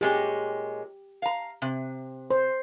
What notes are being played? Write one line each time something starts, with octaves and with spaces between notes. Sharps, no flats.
A#2 G#3 C#4 G4
F5 A#5
C3
C5